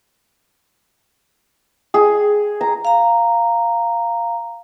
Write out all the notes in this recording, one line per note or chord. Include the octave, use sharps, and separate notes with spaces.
G#4
A#5
F5 A#5